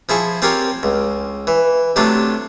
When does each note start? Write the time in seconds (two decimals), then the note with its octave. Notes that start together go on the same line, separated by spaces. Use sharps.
0.09 F3 E4 G#4 C#6
0.42 C4 F4 G4 A#4 C#5
0.83 C#2
1.47 E3
1.96 C3 F#3 A3 D4 F4